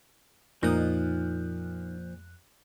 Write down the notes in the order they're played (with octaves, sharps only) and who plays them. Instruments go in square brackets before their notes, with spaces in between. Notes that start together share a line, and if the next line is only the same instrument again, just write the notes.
[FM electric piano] F2 F#6 [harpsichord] A#2 D#6 [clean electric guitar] F3 [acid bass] D#4